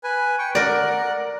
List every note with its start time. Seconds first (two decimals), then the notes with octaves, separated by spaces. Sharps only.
0.04 B4 G#5
0.39 G5 C#6
0.55 A#4 D5 F#5